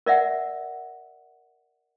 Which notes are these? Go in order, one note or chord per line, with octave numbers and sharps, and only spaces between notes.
A#4 D5 E5 F#5